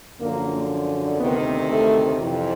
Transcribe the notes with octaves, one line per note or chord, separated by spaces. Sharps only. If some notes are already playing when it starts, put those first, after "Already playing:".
F#2 D3 F3 A#3
D2 C3 D#3 B3
A3
F2 C3 E3